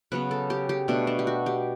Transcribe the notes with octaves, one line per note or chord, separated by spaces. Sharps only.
C#3 F#3 B3 B4
A4
G4
G4
B2 A3 D4
D4
G4
F#4
G4